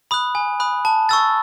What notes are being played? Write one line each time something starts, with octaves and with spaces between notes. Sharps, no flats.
B5 D#6 F#6
G#5
B5 D#6 F#6
A5
C#6 E6 A6